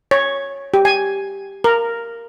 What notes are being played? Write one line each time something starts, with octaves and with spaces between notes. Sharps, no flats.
C#5
G4
G#5
A#4